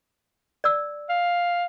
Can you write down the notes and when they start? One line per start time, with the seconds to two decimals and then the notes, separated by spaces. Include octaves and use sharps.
0.64 D5 E6
1.09 F5